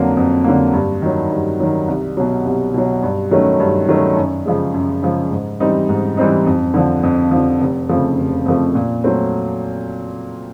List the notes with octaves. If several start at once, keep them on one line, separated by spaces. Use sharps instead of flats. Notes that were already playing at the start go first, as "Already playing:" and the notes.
Already playing: F2 D3 F#3 A#3
F2
D3 F#3 A#3
G2
D#3 F#3
G2
D#3 F#3
C2
B2 F#3
C2
B2 F#3
G2
D#3 F#3 A3 C#4
G2
D#3 F#3 A3 C#4
F#2
C#3 F3 G#3
F#2
C#3 F3 G#3
G#2
E3 G3 C4 D#4
G#2
E3 G3 C4 D#4
F2
D3 F3
F2
D3 F3
F1
F2 C#3 F3 A3
F1
F2 C#3 F3 A3
A#2
F#3 A3 C4